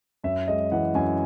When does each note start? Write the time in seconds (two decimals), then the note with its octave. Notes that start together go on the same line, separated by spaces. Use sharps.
0.24 F#2 E5
0.48 G#3 D#5
0.72 E3 F#5
0.95 F#2 G#5